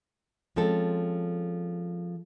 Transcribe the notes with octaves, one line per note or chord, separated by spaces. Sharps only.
F3 G#3 C4 C#4 A4